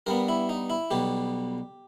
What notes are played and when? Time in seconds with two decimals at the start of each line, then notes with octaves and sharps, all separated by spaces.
0.06 G2 G3 B3 A#4
0.28 E4
0.49 D#4
0.70 E4
0.91 B1 B2 G3 G4